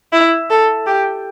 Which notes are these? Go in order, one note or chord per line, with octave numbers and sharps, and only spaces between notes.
E4
A4
G4